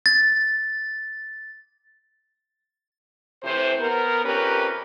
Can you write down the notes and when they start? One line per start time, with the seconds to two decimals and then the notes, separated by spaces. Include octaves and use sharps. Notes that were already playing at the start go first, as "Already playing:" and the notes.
0.06 A6
3.44 A2 C3 E3 C5
3.79 B3 A#4
4.25 F2 C#4 G4 A#4 B4